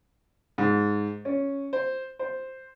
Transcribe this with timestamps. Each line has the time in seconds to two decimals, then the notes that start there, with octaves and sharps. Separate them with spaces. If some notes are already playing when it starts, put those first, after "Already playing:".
0.58 G#2
1.25 C#4
1.73 C5
2.19 C5